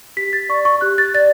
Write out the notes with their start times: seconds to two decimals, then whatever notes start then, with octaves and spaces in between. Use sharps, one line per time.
0.17 G4 B6
0.33 A6
0.49 D5 C#6
0.65 C#6
0.81 G4 F#6
0.98 A6
1.14 D5 A6